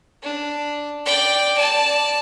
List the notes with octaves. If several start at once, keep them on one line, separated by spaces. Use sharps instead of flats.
D4
D5 G5
D5 A5